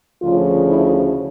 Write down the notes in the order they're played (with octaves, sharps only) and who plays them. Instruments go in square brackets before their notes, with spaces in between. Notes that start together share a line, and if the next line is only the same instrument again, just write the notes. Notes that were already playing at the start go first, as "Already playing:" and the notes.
[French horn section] D2 C#3 F3 F4
E4